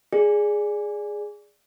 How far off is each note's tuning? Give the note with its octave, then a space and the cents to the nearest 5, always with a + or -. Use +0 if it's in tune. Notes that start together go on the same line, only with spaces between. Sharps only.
G#4 +0 D5 +0